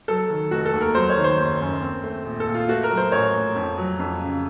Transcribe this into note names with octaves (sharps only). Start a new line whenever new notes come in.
F#3 A4
D#3
F1 F#4
A4
D#2
A#4
F#3 C5
C#5
D#3
C5
F#1
F#2
C4
A3
A#1
A4
A#2
F4
A3 F#4
A#4
F#3
C5
A1 C#5
A2
F2
F#3
F2
C#3